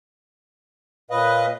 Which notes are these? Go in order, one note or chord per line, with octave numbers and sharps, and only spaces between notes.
A#2 B4 C#5 D#5 F5